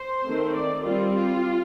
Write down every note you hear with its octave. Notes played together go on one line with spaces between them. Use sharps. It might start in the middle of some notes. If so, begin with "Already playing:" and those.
Already playing: C5
D#3 A3 C4
D5
G3 C4 F4
F4